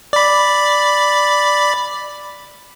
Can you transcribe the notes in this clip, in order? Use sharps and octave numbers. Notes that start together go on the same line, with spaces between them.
D5 B5